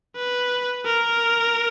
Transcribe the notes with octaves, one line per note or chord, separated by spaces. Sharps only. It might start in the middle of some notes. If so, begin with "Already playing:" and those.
B4
A#4